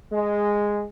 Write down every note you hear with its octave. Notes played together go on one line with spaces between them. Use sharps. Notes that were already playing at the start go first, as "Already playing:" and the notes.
G#3